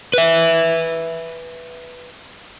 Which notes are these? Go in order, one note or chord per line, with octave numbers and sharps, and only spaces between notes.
B4 E5